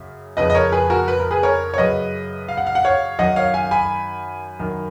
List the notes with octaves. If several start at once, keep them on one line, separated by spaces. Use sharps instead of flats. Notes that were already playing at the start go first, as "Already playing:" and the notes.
Already playing: F#2 C#3
F2 C#3 B4 D#5
D#5
A#4 C#5
G#4 B4
F#4 A#4
B4
A#4
G#4 B4
A#4 C#5
C#5
F#2 C#3 B4 D#5
F5
F#5
F5
F#5
C#5 F5
F#2 D#3 D#5 F#5
C#5 F5
F5 G#5
G#5 B5
F#2 D#3